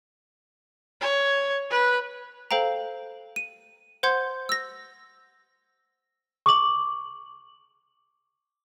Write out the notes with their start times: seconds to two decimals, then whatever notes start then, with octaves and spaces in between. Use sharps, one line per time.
1.01 C#5
1.71 B4
2.51 A4 C5 F5 G5 A#5
3.36 D#7
4.03 C5 F#5 C6 G6 G#6
4.49 E6 A#6
6.46 C#6 D6 F#7